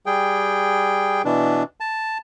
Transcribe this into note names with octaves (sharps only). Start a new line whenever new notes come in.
G3 G#4 G5
B2 E3 D4
A5